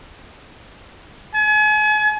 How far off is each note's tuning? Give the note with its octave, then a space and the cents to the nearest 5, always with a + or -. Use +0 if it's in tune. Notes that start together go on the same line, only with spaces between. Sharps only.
G#5 +40